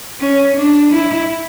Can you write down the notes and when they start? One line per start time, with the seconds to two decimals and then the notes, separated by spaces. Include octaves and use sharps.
0.20 C#4
0.56 D4
0.92 E4